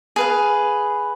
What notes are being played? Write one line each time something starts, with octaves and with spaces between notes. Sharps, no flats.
G#4 B4 F5